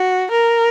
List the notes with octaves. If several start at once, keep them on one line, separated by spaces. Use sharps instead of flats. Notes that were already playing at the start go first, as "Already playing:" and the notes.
Already playing: F#4
A#4